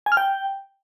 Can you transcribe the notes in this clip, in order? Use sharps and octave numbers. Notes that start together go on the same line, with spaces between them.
G#5
F6
G5